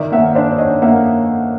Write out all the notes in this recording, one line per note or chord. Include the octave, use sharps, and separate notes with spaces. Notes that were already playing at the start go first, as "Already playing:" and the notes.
Already playing: D#3 D5 E5
A#3 E5 F#5
D4 C5 D5
D4 C#5 D#5
A#3 E5 F#5